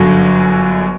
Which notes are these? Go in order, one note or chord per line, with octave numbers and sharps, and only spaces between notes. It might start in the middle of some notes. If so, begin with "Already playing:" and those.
Already playing: G1 F#2 D3 F#3